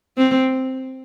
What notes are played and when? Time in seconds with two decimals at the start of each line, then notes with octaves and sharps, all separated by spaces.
0.18 C4